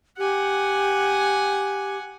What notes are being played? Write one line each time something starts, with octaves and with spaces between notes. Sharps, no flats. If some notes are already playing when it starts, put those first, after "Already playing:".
G4 F#5 G#5